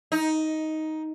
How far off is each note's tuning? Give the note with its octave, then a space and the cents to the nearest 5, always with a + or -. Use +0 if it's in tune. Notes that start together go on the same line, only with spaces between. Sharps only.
D#4 +10